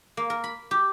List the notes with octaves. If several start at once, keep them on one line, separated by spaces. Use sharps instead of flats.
A#3
A#4
B5
G4